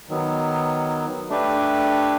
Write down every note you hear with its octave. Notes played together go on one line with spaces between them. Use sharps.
D#3 F#3 B3
A3 D4 G4 B4